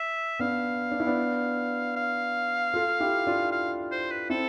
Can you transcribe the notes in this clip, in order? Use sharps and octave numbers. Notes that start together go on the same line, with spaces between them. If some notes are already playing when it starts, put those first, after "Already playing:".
Already playing: E5
B3 D4 F5
D4
E4
B3 D4
F5
F4 A4
E4 G4
D4 F4
F5
C5
B4
C4 E4 A4